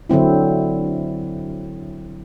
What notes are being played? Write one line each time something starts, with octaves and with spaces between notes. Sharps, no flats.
D3 F#3 C4 E4